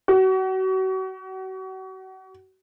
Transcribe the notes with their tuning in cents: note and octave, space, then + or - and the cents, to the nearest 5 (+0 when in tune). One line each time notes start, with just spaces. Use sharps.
F#4 +35